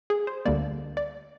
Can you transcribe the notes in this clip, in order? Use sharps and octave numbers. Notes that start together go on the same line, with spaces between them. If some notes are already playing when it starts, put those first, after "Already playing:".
G#4
C5
D2 D3 G3 A#3 D5
D5